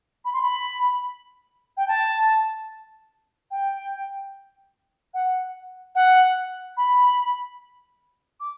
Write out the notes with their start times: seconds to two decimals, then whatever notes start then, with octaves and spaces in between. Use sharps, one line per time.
0.25 B5
0.33 C6
0.42 B5
1.77 G5
1.88 A5
3.51 G5
5.14 F#5
5.95 F#5
6.77 B5
8.40 D6